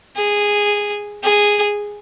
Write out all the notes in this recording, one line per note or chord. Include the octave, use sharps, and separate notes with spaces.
G#4
G#4